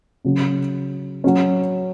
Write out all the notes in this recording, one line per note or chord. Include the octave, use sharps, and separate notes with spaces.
C#3 F#3 C#4
F#3 C#4